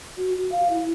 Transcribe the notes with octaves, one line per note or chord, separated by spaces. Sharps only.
F#4
F#4
F5
E4